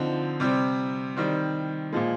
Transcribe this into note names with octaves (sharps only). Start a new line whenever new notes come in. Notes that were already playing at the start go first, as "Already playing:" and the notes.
Already playing: D3 F3 C4 D#4
C3 G3 C4
D#3 G3 C4
A#2 F3 G#3